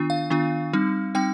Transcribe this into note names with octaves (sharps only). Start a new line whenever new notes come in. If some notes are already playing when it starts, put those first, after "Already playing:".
Already playing: D#3 B3 D4 F4
F5
D#3 B3 D4 F4
G3 C4 D#4
G3 C4 D#4 G5